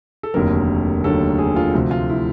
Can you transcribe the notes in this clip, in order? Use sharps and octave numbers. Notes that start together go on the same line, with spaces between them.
A4
F1 D#2 D3 F#3 A#4
F1 D#2 D3 F#3 A4
G#4
F4
D2 C3 F3 F#4
F4
E4